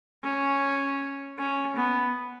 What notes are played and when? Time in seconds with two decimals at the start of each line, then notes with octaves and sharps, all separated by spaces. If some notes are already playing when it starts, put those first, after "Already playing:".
0.24 C#4
1.38 C#4
1.76 B3